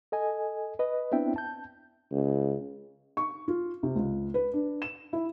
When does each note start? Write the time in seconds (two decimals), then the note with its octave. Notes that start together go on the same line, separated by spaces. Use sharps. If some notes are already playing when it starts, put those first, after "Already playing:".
0.12 A4 D#5 G#5
0.79 B4 D#5
1.12 B3 C4 D4 E4 E5 G5
1.36 A5 G6
2.12 C#2
3.17 C#6
3.48 F4
3.83 C3
3.96 C#2
4.34 B4
4.54 D4
4.82 E7
5.13 E4